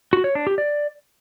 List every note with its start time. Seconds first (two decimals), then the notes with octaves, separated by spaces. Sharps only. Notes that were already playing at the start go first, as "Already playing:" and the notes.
0.13 F#4
0.24 C#5
0.35 D4
0.47 G4
0.58 D5